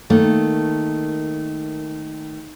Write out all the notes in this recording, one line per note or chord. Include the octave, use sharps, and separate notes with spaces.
D#3 A3 A#3